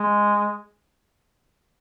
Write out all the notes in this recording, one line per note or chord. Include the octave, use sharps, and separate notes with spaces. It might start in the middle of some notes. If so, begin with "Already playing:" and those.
Already playing: G#3